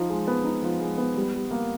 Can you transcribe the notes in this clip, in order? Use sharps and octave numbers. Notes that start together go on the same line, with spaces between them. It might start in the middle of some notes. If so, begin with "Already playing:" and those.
Already playing: F3 D#4
G#3
B3
D#4
F3
G#3
B3
G3
G3
A#3